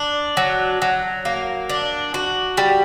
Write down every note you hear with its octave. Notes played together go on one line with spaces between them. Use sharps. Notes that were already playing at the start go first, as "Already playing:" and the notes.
Already playing: D4
F#3
F#3
A#3
D4
F#4
G3